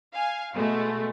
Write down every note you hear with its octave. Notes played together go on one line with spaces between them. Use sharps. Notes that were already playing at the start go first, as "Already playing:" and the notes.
F5 G#5
B2 G#3 A3